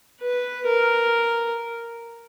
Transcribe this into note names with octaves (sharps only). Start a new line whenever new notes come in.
B4
A#4